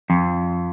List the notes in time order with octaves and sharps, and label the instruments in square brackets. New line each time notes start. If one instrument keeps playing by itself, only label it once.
[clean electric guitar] F2